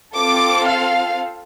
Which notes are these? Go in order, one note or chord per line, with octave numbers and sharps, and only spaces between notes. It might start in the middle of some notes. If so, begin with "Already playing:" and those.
C4 F4 A4 D6
F5